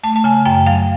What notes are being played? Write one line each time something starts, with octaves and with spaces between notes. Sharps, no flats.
A3 A5
A5
C#3 G#5
F#2 G5
F#3 F5